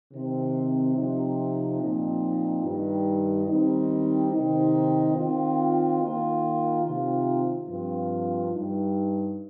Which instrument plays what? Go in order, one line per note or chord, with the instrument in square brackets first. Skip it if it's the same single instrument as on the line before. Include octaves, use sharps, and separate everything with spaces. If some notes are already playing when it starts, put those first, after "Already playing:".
[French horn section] C3 D#3 C4
C3 F3 C4 D#4
A#2 F3 C4 D#4
G2 D#3 G3 D#4
D#3 G3 C4 D#4
C3 D#3 C4 D#4
D#3 C4 F4
D#3 A#3 F4
C3 D#3 C4 F4
G2 F3 C4 F4
G2 G3 D#4